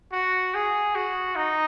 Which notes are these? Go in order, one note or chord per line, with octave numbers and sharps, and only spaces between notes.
F#4
G#4
F#4
D#4